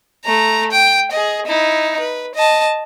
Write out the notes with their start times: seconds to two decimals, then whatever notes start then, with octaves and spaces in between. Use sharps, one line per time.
0.25 A3 A#5
0.71 G5
1.12 G#4 D#5
1.46 D#4 E4
2.00 B4
2.35 D#5 A5